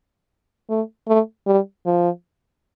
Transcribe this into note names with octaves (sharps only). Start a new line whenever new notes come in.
A3
A3
G3
F3